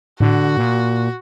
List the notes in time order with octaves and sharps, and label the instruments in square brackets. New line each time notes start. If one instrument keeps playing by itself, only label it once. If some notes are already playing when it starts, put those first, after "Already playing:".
[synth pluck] A2 [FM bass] D3 [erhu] F#4
[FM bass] A#2